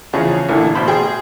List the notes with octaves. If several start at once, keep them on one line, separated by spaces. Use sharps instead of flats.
E2 C#3 F3 C#4 G#4 C#6
A1 A#2 D3 E3 A3
A1 B2 C5 B5
G#4 G5 C6